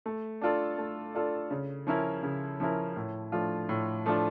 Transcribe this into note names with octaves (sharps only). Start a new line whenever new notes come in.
A3
D4 F4 A4 D5
A3
D4 F4 A4 D5
C#3
F3 C#4 E4 A#4
C#3
F3 C#4 E4 A#4
A2
F3 A3 D4 F4
A2
F3 A3 D4 F4